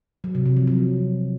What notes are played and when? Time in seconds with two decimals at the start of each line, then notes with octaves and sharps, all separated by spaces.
0.24 F#3
0.35 C3
0.46 C3
0.57 F3
0.67 F#3